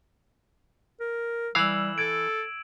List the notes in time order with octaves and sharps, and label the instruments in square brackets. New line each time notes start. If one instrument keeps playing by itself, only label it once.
[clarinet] A#4
[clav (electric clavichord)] E3 F5 [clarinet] G3 [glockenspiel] E6 E7 F#7
[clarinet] A4 [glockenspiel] G#6 D7